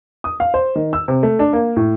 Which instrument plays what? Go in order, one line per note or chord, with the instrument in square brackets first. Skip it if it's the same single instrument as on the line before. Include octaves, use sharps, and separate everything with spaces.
[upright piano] D#6
F5
C5
D#3
E6
C3
A3
D4
A#3
A2